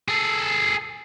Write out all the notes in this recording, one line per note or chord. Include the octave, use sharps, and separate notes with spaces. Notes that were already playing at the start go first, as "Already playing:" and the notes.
G#4 A4